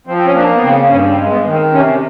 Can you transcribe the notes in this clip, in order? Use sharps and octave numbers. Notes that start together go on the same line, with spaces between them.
F3 C4
C4
C#4
A#3 D4
B3
C#3 C4
G2 C#4
C4
G#3
B3
D#3
C4
C3 C#4